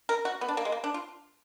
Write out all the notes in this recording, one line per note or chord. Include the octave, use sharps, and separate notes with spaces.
A#4
F#4
B3
D4
A#3
G#3
A#3
D4
F4